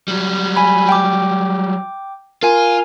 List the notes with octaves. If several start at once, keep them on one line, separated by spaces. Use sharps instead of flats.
F#3 G3
G#5 B5
G5 D6
F4 A#4 G#5